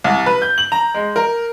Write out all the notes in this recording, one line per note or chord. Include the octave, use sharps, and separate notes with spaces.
C2
B4
G6
F#7
A#5
G#3
A#4